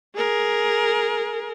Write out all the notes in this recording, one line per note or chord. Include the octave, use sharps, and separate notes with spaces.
G#4 A#4